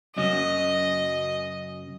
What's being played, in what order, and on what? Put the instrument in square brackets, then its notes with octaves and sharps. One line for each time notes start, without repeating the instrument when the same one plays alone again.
[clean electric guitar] F#2 C#3 F#3 C#4 [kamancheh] D#5